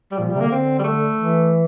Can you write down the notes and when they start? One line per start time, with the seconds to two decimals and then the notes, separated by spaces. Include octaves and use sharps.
0.12 G3
0.19 A#2 F3
0.29 G3
0.35 C3
0.40 D3 A#3
0.51 D3 C4
0.79 G3
0.84 A3
1.16 E3